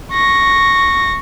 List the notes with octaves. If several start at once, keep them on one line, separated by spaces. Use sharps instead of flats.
C#6 A#6